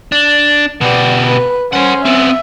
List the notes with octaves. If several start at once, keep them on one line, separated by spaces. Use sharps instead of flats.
D4
B2 B3 G4 D5
B4
C#4 A#4 C5 F#5
B3 C4 E5